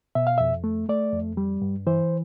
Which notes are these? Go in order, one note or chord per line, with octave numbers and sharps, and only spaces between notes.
B2 E5
F5
F2 E5
A3
A3 D5
F2
G3
G2
E3 C5